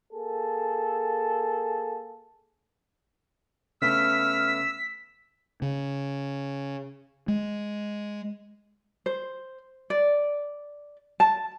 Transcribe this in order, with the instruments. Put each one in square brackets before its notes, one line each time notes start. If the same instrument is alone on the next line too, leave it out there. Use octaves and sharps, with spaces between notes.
[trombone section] A#3 G#4 A4
[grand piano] C#3 A3 B3 [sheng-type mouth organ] E6 [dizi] F6 [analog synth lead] B6
[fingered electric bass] C#3
G#3
[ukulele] C5
D5
A5